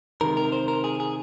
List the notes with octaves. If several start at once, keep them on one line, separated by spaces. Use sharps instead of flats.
C3 D#3 G#3 A#4
A#4
C5
A#4
G#4
G#4